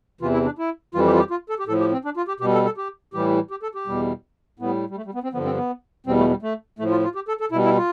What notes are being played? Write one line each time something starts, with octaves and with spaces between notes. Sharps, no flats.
E2 C3 E3 F4
E4
D4
E4
F2 E3 G3 F4
G4
F4
G4
F4
A4
G4
A2 F3 A4
G4
C4
D4
F4
G4
B2 G3 G4
A4
A4
G4
A2 E3 G3 G4
G4
A4
G4
E2 B2 G3
A2 G3 B3
G3
A3
G3
B3
C4
G2 D3 F3 B3
C4
B3
E2 B2 G3 C4
A3
G3
A3
A2 F3 A3
F4
F4
G4
A4
A4
B2 G3 E4
E4
F4